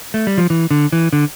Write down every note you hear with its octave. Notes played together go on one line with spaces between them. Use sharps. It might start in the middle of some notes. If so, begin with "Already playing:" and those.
A3
G3
F3
E3
D3
E3
D3